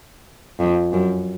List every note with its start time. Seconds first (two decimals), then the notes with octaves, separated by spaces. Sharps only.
0.60 F2
0.93 F#2